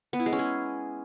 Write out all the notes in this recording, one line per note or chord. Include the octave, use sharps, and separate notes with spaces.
B3
E4
G#3
C#4
G#4